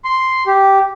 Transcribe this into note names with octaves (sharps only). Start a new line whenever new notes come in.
C6
G4